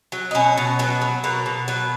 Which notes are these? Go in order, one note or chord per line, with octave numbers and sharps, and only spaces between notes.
F#3
D#4
B2 C#4
B2
F#3 B3
F#3
B2 A#3
B2
F#3 B3